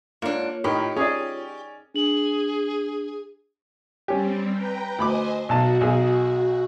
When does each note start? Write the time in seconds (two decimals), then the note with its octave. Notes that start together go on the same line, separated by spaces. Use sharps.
0.22 G#2 A#3 D4 F4 C#5
0.64 A2 D#4 G4 A#4
0.97 C#4 G#4 D5
1.94 D4 G#4 F#7
4.08 G3 C4 C#4 G4
4.54 B4 G5 A#5
4.99 D2 C5 D#5 G#5 B5 D6
5.49 B1 F#4 A5
5.81 B1 G#4